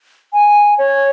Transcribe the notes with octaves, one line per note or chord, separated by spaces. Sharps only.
G#5
C#5